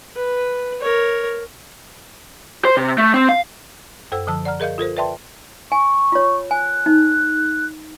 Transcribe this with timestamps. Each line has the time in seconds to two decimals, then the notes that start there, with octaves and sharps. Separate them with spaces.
0.16 B4
0.81 A#4 C#5
2.65 C5
2.77 C3
2.98 A3
3.14 C4
3.29 F5
4.12 F#2 A4 C5 F#5 E6
4.27 D3 F3 A5 E6
4.45 D5 F#5 A#5 F6
4.60 G#4 A#4 D#5 F5 G6
4.78 F4 A4 A#4 C5
4.97 B4 D5 E5 G5 A5 C6
5.72 G#5 C#6
6.12 F4 C#5
6.51 G#5 F#6
6.86 D#4